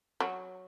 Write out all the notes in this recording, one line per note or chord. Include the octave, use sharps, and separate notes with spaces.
F#3